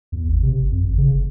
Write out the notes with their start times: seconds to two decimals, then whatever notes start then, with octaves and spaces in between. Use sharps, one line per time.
0.12 E2
0.28 G#1
0.43 C3
0.58 G1
0.72 F2
0.83 G#1
0.98 C#3
1.11 F#1